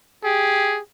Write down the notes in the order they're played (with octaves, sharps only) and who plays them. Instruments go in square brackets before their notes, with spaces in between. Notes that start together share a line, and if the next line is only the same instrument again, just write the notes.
[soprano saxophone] G4 [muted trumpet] G#4